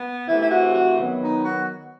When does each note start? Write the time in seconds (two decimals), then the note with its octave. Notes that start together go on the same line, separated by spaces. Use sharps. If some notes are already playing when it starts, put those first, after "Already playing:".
Already playing: B3
0.27 C3 E3 A3 C4 E4
0.42 E4
0.51 F#4
0.74 F#4
0.98 D#3 F#3 B3
1.22 D#4
1.45 F#4